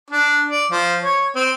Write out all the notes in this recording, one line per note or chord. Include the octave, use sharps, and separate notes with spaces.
D4
D5
F3
C#5
C4